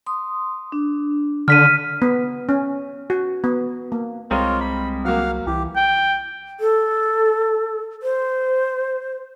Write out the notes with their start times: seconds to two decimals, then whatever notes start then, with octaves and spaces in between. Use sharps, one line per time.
0.06 C6 D#6
0.72 D4
1.48 D3 F6 B6 D#7
2.02 B3
2.49 C#4
3.10 F#4
3.44 B3
3.92 A#3
4.31 C2 G3 G#3 C4 F4 A#4 C#5
4.60 B5
5.05 F#3 A#3 F5 F#5 F6
5.46 C2 E3 G4
5.76 G5
6.60 A4
8.03 C5